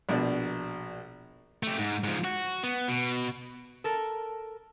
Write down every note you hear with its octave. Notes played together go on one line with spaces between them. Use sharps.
A#1 B2 D5
A3 G4
G#2
G#2 F3
F#4
B3
B2
A4 A#4